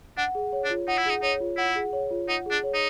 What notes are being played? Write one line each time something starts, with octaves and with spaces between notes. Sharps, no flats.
D4 F#5
G#4
C#5
D4
F4
D#4 F#5
E4
D#4 G#4
D#4 C#5
F4
E4 F#5
G#4
C#5
F4
D#4 F#5
G#4
D4
C#5
D#4